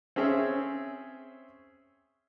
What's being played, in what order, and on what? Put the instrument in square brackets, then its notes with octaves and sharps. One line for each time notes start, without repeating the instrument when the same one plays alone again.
[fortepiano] C4 C#4 G#4 E5